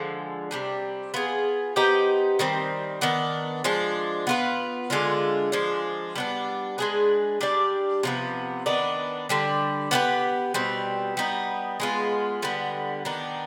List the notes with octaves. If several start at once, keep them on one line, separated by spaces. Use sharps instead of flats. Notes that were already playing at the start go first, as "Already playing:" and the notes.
Already playing: D3 F3 G#3
C3 G3 D4
B3 F4 G#4
B3 D#4 G4 C5
D#3 G3 C4
D#3 B3 D4
F3 G#3 D4
B3 F4 B4
D3 G#3 D4 F4
F3 G#3 D4
G3 B3 D4
G#3 D4 G#4 B4
G3 D4 G4 D5
C3 F3 B3
D#3 B3 D4
D3 G3 D4
B3 D4 G4 B4
B2 G3 C4
G3 B3 D#4
G#3 B3 F4
D3 G3 B3
D#3 B3 D4